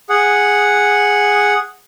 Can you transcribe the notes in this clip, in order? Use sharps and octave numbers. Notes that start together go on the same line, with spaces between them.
G#4 F#5